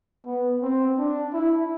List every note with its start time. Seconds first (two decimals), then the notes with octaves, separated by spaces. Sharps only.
0.26 B3
0.62 C4
0.98 D4
1.34 E4